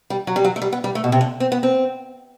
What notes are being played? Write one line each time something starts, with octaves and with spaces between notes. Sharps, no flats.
G3
F#3
G3
F#3
A3
G3
B3
G3
A3
B2
C3
D3
C4
B3
C4